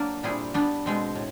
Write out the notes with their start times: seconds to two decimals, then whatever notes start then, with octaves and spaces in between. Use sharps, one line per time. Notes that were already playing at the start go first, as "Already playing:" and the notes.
Already playing: F#3 A#3 D4
0.23 A#2 G3 C4 E4 G#4
0.54 G3 B3 D4
0.86 B2 G#3 C4
1.15 A2